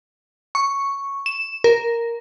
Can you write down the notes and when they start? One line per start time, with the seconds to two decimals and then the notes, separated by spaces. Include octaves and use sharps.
0.55 C#6
1.26 E7
1.64 A#4